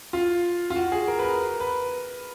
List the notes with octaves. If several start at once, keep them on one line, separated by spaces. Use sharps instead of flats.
F4
F4
F#4
G#4
A#4
B4
A#4
B4